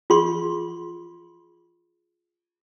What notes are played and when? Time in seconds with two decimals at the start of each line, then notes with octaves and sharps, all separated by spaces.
0.10 F4 G#4 C6 C#6